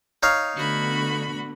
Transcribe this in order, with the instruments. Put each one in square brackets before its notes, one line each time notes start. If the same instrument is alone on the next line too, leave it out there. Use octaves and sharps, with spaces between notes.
[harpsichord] D#4 C#5 F5
[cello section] D3 A3 B3 [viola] F#4 B5